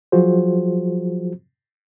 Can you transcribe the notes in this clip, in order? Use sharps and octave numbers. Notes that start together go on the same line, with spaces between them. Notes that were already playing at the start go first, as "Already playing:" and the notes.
F3 F#3 F4 F#4 G#4 C5